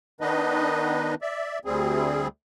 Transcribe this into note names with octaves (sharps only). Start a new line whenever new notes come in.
D#3 B3 D4 D#4 B4 D#5
D5 E5
D2 G3 C4 G#4